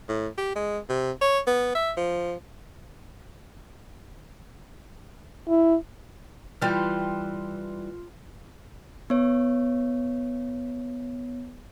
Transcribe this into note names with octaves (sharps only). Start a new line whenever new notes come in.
A2
G4
G#3
C3
C#5
B3
E5
F3
E4
E3 G3 F4 C6 F6
B3 C#5